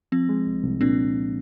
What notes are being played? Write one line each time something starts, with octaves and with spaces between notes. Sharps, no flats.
F3 C4
G#3
C2
C2
A#2 C4 D4